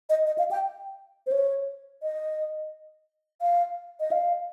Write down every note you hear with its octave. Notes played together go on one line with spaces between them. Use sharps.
D#5
D#5
F5
G5
C5
C#5
D#5
F5
D#5
F5